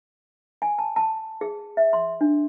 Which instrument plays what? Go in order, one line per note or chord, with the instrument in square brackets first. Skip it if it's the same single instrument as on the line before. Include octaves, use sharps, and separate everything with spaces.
[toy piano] G#5
A5
A5
G#4
E5
C6
D4